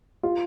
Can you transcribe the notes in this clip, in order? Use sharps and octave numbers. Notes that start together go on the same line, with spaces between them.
F4